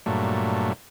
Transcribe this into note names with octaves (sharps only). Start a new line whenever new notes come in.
G2 A#2 F#3 A3